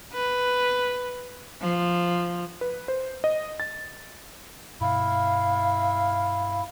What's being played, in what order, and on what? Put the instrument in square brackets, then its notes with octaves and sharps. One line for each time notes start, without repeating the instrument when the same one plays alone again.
[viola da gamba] B4
F3
[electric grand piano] B4
C5
D#5
A6
[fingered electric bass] G2 B2 [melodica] E4 [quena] F5